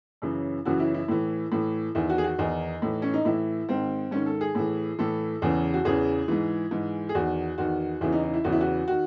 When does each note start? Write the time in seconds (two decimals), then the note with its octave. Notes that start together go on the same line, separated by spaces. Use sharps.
0.22 F#2 C#3 E3
0.65 F#2 C#3 E3 F#4
0.80 E4
0.94 E4
1.08 A2 E3
1.52 A2 E3
1.95 E2 D#3 E4
2.10 F#4
2.18 G#4
2.24 F#4
2.39 E2 D#3 D#4
2.82 A2 E3
3.02 C#4
3.14 D#4
3.25 A2 E3 E4
3.69 G#2 D#3 C4
4.11 G#2 D#3 C#4
4.26 A4
4.41 G#4
4.55 A2 E3
4.99 A2 E3 A4
5.42 E2 C#3 E3
5.74 F#4
5.85 E2 C#3 E3 G#4
6.28 G#2 E3
6.71 G#2 E3
7.09 G#4
7.15 E2 D#3 F#4
7.58 E2 D#3 F#4
8.01 E2 C#3 E3 E4
8.12 D#4
8.23 D#4
8.34 E4
8.44 E2 C#3 E3 F#4
8.52 E4
8.61 F#4
8.88 D#3 F#4